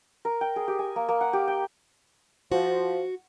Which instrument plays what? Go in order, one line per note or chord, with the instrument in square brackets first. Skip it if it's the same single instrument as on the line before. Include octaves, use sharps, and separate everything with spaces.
[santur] A#4
G5
G#4
G4
G#5
A#3
A#3
F#5
G4
G5
[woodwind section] F3 [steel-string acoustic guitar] F#4